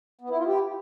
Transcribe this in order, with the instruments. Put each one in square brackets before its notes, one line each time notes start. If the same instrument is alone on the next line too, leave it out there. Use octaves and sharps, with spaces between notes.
[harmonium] B3
E4
F4
G4